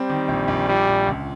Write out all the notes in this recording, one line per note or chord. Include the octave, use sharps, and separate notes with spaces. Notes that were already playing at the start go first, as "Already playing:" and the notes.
Already playing: G3 C4
D#3
A#1
A#1
A#2 G3
A#2
C#2